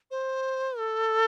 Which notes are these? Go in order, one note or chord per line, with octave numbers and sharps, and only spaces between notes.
C5
A4